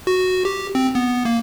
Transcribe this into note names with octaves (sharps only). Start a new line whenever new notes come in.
F#4
G4
C4
B3
A#3